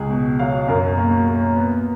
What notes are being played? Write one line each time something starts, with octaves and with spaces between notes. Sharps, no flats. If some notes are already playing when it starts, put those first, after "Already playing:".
Already playing: C#2 G#4
B2
F#3 F5
F#2 A#4
A#3
A#3
B3